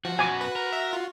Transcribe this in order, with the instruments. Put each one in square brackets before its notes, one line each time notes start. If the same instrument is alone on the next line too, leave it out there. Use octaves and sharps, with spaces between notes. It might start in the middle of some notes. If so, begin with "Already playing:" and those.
[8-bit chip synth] F3 [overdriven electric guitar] F#4
[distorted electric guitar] F#2 B2 [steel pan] G#5 D6
[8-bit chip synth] B4
[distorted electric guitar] A#4
[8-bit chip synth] E5
F4